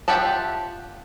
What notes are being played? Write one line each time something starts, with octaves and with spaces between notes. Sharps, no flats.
F4 G4 E5 F#5 A5